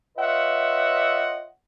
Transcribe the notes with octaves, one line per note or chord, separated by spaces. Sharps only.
F4 B4 C#5 D#5 E5 F#5